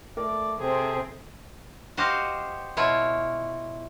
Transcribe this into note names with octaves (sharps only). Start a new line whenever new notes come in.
A3 A#4 D5
C3 C4 G#4 A4
F#4 G4 C5 D#5 F5
B2 E4 F4 C#5